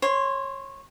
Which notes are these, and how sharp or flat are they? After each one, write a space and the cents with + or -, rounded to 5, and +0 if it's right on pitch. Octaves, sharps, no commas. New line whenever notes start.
C#5 -20 C6 +0